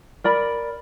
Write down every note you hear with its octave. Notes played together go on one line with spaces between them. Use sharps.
A#4 D5 B5